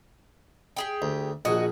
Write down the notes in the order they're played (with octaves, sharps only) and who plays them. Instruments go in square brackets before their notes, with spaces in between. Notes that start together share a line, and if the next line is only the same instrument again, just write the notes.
[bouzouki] G4 G#4 G5
[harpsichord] D2
[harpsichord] A#1 G#4 [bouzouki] F#4 D#5